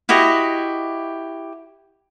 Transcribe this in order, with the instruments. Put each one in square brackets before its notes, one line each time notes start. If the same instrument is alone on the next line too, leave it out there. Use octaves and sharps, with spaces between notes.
[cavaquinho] E4 F#4 G4 D#5